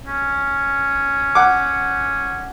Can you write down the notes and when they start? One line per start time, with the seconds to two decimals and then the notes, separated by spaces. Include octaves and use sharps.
0.07 C#4
1.35 F#5 D6